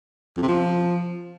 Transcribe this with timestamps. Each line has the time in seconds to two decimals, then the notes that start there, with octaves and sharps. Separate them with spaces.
0.37 F2
0.43 C3
0.48 F3